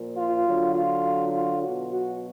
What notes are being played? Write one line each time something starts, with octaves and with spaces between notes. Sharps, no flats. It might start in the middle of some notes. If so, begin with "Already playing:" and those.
Already playing: A#2 F3
F4
D3 F#3
F4
F4
B2 F#3 F#4
F#4